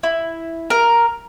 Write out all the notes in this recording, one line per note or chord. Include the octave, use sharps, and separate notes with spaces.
E4
A#4